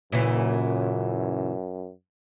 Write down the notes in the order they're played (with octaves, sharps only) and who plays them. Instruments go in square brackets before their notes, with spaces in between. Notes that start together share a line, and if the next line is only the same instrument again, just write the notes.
[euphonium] F#2 [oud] A#2 C#3 E3